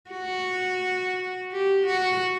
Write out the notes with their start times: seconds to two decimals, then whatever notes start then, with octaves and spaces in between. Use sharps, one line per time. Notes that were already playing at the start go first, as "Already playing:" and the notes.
0.11 F#4
1.51 G4
1.87 F#4